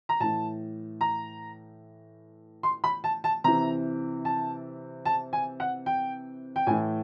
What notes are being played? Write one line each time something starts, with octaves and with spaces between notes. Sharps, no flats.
A#5
A2 E3 A5
A#5
C6
B5
A5
A5
C3 E3 A#5
A5
A5
G#5
F#5
G5
G5
A2 E3 G#5